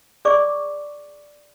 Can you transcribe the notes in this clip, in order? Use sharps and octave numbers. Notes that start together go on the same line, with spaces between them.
G#4 D5 C#6 D6